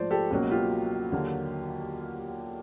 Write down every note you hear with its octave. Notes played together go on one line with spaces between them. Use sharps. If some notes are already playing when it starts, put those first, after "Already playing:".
Already playing: A#1 G#2 F3 A3 C5 D5
G4 A4
C#2 B2 F#3 A#3
F4 G4
D#2 D3 F#3 A#3